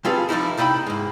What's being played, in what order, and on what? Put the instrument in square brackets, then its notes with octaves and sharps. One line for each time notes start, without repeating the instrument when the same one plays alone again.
[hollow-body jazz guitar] G3 C4 F4 G#4 A4 B4
D3 F3 G3 D#4 E4
C2 D#4 E4 G5 B5
G#2 G#3